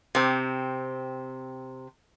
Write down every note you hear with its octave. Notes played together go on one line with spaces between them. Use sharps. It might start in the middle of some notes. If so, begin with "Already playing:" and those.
C3 C4